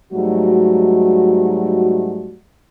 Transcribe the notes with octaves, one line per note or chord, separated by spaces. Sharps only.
G#2 F#3 G3 A3 D#4 F#4